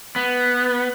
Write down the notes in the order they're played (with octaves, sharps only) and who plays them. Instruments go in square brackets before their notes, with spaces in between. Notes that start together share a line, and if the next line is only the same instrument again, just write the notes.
[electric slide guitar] B3